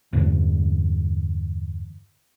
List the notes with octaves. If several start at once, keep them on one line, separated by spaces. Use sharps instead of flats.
E2 G2 D3